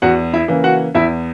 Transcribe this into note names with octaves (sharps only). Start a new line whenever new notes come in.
E2 F#4 F#5
E4 E5
C#3 E3 A#3
F#4 F#5
E2 E4 E5